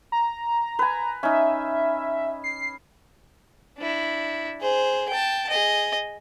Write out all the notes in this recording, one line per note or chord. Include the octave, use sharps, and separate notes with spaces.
A#5
B4 G#5
C#4 D#4 E5
C7
D4 E4
G#4 C5
G5 A5
G#4 D#5